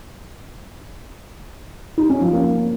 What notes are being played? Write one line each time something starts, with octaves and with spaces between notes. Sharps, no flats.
D#4
C#4
F3
A#3